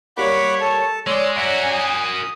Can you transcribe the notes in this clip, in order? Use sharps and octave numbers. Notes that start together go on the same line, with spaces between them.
G3 A#3 C#5 F#5 B5 D6
A4 A5
G#3 C#5 D5 C6 E6
F#4 A#4 E5 F#5 G#5
D#6